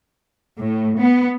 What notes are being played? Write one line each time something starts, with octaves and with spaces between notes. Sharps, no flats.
A2
B3